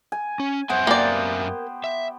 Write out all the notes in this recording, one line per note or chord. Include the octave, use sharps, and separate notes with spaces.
G#5
C#4
F#2 B3 C5 E5 G#5
A#3 G4 D5
E5